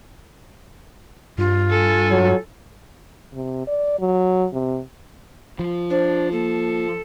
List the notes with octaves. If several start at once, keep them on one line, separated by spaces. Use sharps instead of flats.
G2 F4
A4 G#5
F#3
C3
D5
F#3
C3
F3
D4 C5
A#3 A4